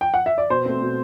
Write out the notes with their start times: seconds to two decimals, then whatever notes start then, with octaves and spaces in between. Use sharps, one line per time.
0.01 G5
0.14 F#5
0.26 E5
0.38 D5
0.50 B2 C5
0.65 A3 C4
0.81 B2